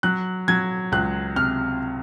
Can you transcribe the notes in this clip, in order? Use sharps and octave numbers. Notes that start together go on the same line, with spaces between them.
F#3 F#6
F#3 G#6
C#2 F#6
C3 F6